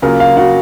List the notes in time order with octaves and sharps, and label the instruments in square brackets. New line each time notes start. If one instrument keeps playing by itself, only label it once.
[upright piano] C#3 F#3 A#3 F4 [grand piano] A#4
[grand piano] F5
F#4